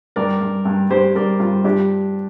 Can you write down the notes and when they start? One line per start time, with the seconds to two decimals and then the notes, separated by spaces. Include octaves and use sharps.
0.16 G2 A#4 D5
0.41 G2
0.65 G2
0.90 G2 G4 C5
1.15 G2 A#4 D5
1.40 G2 F4
1.64 G2 D4 G4